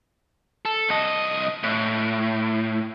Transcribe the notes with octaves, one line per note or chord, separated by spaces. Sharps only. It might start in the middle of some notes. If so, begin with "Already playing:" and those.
A4
C2 D#5
A2